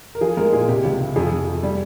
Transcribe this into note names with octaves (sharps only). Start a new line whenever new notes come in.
A#4
F3 G#4
G#3 A#4
A#2 G#4
C3 G4
C#2
C3
F2 G#4
F2
F2
G3